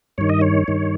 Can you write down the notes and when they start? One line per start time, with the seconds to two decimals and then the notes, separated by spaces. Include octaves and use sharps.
0.18 G2 D#3 C#5
0.29 D#5
0.41 C#5
0.68 G2 D#3